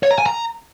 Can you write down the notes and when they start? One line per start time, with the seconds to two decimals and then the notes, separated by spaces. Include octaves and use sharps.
0.03 C#5
0.11 A#5
0.18 G#5
0.26 A#5